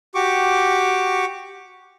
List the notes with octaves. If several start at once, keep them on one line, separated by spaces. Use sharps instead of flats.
F#4 G4 C#6 D6